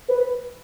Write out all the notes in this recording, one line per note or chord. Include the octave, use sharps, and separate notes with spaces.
B4